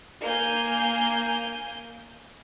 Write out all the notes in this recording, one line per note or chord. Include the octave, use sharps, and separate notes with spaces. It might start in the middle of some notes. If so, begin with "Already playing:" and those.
A#3 G#5 G6